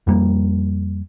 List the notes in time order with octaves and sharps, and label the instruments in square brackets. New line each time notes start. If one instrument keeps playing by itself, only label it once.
[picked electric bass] F2 G3 A#3